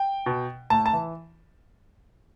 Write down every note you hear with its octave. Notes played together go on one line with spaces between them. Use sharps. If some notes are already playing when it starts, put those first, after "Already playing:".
Already playing: G5
B2
A2 A5
A5
E3